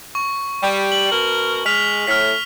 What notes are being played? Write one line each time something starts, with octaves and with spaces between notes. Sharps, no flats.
C#6
G3
F#7
B2 A#4
G#3 F6 B6 F7
A2 F6 B6